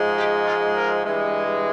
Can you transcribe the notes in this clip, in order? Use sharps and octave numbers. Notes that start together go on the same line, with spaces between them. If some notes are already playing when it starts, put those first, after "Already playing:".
Already playing: G#2 F3 G#3
G4
F4
A#4
G2 E3 G#3
G#4